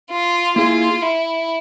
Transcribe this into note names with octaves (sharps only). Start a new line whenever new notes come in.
F4
A#3 E4 F4 G#4
E4